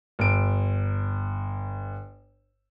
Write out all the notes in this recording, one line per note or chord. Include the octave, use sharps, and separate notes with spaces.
G1 D7